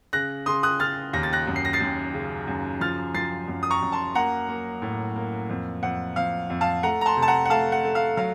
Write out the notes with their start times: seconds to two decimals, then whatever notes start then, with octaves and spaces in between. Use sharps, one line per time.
0.13 C#3 F#6 A#6
0.46 C#3 C6 D#6
0.63 D#6 F#6
0.80 C#3 F6 A6
1.13 D#2 A#6
1.23 A6
1.33 F#6 A#6
1.47 F#2
1.56 C7
1.65 A#6
1.73 A6 C7
1.80 F#2
2.14 C#3
2.47 F#2
2.81 F3 F6 A6
3.15 F3 A6 C7
3.48 F#2
3.63 D#6
3.70 A#5 C#6
3.82 F#2
3.92 A5 C6
4.15 A#3 F#5 A#5
4.49 A#3
4.82 A2
5.16 A#3
5.50 F2
5.83 F2 F#5
6.16 F2 F5
6.50 F2
6.61 F5 A5
6.83 A3 F#5 A#5
7.01 A#5
7.06 A5 C6
7.17 C3
7.22 A5
7.28 F#5 A#5
7.45 F#5
7.50 A3 F5 A5
7.72 F#5
7.84 A3
7.95 F5
8.17 F#3 F5